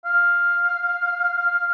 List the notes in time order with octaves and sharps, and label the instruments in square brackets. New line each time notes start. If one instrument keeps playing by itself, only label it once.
[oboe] F5